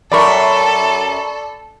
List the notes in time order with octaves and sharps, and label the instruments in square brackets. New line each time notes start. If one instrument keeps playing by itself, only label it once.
[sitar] F#2 A#4 [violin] A4 [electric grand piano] D5 B5 C#6